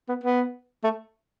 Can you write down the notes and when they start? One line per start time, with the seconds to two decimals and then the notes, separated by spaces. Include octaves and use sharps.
0.09 B3
0.24 B3
0.84 A3